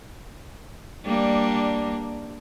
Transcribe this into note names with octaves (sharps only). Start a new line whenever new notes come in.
G3 A#3 D4